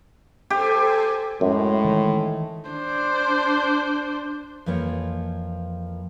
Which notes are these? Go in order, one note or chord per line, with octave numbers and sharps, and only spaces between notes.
G4 A4 C5 G#5
F#2 A2 G#3
D#3 E3
D4 C5
F2 E3 F3 A#3 C#5